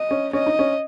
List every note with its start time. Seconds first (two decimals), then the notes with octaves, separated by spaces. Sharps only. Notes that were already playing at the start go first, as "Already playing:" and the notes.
Already playing: D#5
0.11 C#4
0.33 C#4 D#5
0.47 D#4
0.59 C#4